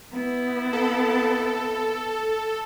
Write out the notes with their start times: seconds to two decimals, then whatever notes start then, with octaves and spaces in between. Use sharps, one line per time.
0.12 B3 E4
0.73 A4